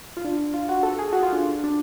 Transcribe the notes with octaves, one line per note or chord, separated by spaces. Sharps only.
F4
D4
F4
F#4
A4
G#4
F#4
F4
D4
D4